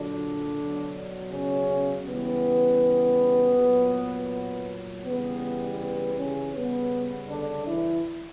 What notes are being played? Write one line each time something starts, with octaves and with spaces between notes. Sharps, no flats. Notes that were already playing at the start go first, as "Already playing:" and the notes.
Already playing: A#2 D3 F#3 D4
B2 F#3
C#3 C#4
C#3 E3 G3 B3
A#2 F#3
C#3 E3 G3 B3
B3
C#3 C#4
C#3 G3 B3
D3 D4
E3 E4